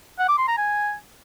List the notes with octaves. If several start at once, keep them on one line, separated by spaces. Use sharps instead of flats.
F#5
D6
C6
A#5
G#5